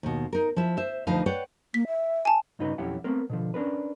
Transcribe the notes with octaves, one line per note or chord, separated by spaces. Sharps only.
D#2 B2
D#4 A#4
F3 E4 E5
C5 E5
D2 F3 D#4 B4 F5
B4 C#5 D5 F#5 G5
A#3 B6
E5
G#5 A5
G2 C#3 D#4 F#4 B4
B1 F2 C#4 E4 G4 F#5
A3 B3 C4 A#4
B2 D3 F3
C#4 D4 A#4 B4